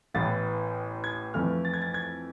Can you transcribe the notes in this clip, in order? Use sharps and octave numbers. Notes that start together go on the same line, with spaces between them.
A1 A2 E3 B3 A6
G#6
F2 E3 A3 F6
A6
G#6
A6
G#6